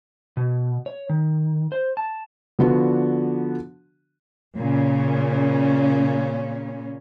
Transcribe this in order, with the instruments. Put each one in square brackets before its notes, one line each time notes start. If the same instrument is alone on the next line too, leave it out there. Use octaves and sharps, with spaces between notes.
[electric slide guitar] B2
C#5
D#3
C5
A5
[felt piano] D3 F3 B3 D4 F#4
[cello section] A#2 C#3 C#4